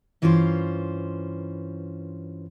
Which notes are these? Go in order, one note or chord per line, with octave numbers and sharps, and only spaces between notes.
G2 E3 C#4 F4 A#4 C5